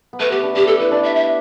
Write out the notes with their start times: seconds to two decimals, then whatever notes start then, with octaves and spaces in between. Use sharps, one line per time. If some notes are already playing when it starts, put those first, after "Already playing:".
0.13 B3
0.20 A3 B4
0.31 B3 G4
0.43 D4
0.55 D4 G4
0.67 G4 A4
0.80 E4 B4
0.91 D4 D5
1.03 E5
1.15 E5